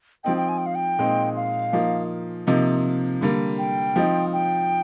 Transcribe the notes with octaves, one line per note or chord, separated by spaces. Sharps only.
F3 C4 D#4 G5
G5
G#5
G5
F5
G5
A#2 G#3 C4 D#4
F5
F3 A#3 D#4
C3 F3 A#3 D#4
D3 G3 A#3
G5
F3 C4 D#4
G5